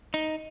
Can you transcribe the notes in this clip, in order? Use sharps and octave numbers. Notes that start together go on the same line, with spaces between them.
D#4